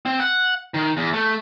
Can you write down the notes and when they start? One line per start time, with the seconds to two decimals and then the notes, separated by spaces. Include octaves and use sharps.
0.06 C4
0.20 F#5
0.74 D#3
0.97 E2
1.13 A3